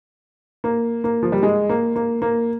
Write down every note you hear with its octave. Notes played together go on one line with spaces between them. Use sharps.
A#3
A#3
F3
G3
G#3
A#3
A#3
A#3